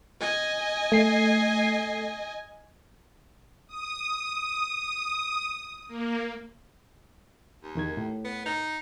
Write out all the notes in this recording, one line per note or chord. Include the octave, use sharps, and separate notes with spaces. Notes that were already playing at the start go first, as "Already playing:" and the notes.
D#5 G#5
A3 C7
D#6
A#3
D#2
E2 D#3 G#6
A2
B3
D#4